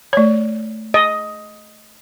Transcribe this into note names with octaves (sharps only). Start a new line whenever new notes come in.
A3 C#5
D#5